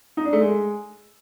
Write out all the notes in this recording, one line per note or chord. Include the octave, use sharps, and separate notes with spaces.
D#4
D4
A3
G#3